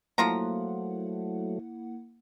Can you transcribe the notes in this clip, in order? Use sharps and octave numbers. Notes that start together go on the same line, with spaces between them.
F3 F#3 A3 A#3 E4 F4 F#5 A#5